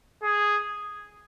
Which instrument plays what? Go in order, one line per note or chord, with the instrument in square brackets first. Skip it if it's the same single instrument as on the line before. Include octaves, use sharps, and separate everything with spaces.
[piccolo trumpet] G#4